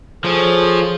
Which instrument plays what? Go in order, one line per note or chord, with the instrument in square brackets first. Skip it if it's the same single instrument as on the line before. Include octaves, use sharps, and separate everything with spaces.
[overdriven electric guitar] F3 [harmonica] G#4 A4 C#5